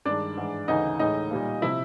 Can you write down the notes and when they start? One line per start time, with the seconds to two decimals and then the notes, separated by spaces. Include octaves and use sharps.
0.05 G2 D#3 G#3 D4 D5
0.37 G#2 E3 G#3
0.68 D2 C#3 E3 D#4 D#5
0.99 A2 E3 G#3 D#4 D#5
1.31 A#2 G3 A#3
1.62 C3 F3 E4 E5